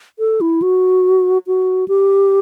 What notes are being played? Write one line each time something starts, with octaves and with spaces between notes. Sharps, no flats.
A4
E4
F#4
F#4
G4